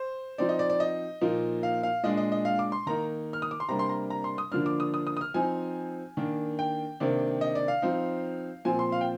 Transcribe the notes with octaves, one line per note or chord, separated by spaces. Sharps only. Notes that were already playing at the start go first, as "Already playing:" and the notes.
Already playing: C5
F3 C4 D#4 D5
D#5
D5
D5
D#5
A#2 F3 A#3 D#4
F5
F5
A#2 G#3 D4 D#5
D#5
D#5
F5
D6
C6
D#3 A#3 D#4 A#5
F6
D#6
D6
C6
C3 G3 A#3 D4 A#5
C6
A#5
A#5
C6
D#6
D3 F3 A#3 D4 F6
D6
D#6
D#6
D#6
D#6
F6
F3 C4 D#4 G#5
D#3 A#3 D4
G5
C3 D#3 A#3 D4
D#5
D5
F5
F3 C4 D#4
A#2 F3 C4 G#5
C6
F5
G5